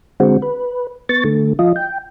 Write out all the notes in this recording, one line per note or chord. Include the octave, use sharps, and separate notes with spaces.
D3 G#3 C4 F#4
B4
B3 C#6 A6
D3 A3
F3 F4 D#5
G5